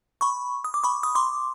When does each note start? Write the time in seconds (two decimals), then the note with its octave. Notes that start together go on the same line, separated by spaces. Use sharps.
0.21 B5 C#6
0.64 D#6
0.74 D6
0.84 B5 C#6
1.03 D#6
1.15 C6 D6